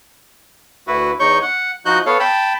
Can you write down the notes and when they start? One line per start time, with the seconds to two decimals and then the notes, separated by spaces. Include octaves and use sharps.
0.87 D2 E4 F#4 B4
1.20 E2 D#4 C#5 C#6 G6
1.42 F#5
1.85 F3 D#4 F#4 F#6 G6
2.06 B3 A4 C#5 F5
2.20 G5 A5 B5